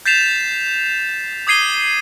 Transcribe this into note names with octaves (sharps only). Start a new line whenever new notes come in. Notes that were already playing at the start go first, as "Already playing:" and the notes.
G6 A6 B6 C7 E7 F7
D6 D#6 G#6 C7 D#7 G7